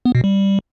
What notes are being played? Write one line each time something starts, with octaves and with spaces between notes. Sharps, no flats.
B3
B2
G3